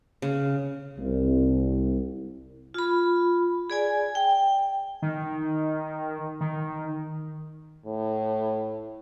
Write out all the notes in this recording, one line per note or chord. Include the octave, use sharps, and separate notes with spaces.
C#3
C2
F4 B5
G#4 D5 G#5
G5
D#3
D#3
A2